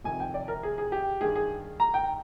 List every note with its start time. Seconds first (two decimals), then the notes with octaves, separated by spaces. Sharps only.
0.04 F2 C3 D#3 G#5
0.20 G5
0.34 D5
0.48 A#4
0.63 G#4
0.78 G#4
0.92 G4
1.21 G2 D#3 G#4
1.36 G#4
1.80 A#5
1.94 G5